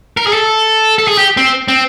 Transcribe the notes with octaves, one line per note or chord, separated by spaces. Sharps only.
A#4
G#4
A4
A4
G#4
G4
C4
C4